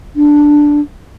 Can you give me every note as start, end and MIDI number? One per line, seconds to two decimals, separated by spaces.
0.16 0.80 62